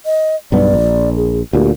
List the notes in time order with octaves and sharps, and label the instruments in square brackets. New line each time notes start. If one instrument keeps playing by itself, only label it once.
[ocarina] D#5
[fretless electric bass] B1 G2 B3 [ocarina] D5
[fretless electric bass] A#1
[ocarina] G#4
[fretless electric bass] D2 A#2 [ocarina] G4